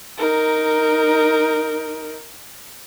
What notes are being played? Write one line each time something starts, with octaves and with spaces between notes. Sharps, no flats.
D#4 A#4